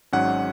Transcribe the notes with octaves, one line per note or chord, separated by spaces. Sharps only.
G#1 G#2 F#3 C#4 F#5